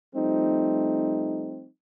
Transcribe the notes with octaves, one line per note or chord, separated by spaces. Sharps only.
F3 G3 A3 C4 D#4